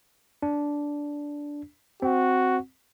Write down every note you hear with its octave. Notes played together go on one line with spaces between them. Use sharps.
D4
C4 F#4